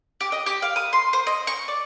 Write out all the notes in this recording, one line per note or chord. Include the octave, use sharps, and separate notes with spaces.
G4
D#5
G4
F5
D#6
C6
C5
D#5
C#6
D5